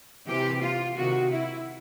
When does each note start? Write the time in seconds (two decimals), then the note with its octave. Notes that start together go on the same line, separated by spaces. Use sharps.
0.27 C3 E3 G4
0.62 F4
0.96 C3 D#3 F#4
1.32 E4